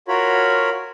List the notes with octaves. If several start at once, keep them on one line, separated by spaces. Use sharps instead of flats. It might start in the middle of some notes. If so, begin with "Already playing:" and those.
F4 F#4 A#4 C#5 B5